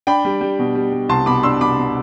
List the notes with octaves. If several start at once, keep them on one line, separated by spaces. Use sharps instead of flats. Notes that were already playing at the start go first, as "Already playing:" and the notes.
D4 G5 B5
G3
G3
B2
G3
G3
C2 A5 C6
B2 B5 D6
D4 C6 E6
B2 B5 D6
B2